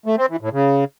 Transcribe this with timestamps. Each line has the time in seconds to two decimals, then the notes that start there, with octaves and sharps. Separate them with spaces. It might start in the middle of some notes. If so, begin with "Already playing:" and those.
0.06 A3
0.18 C4
0.29 E3
0.41 A2
0.53 C#3